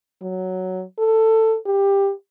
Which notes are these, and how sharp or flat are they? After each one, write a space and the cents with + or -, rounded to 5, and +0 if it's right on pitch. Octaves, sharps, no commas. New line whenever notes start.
F#3 +5
A4 +15
G4 +15